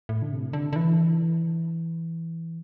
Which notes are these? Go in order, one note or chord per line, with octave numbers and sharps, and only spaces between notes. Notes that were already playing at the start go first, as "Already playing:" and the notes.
A2
D3
C3
D3
D3
E3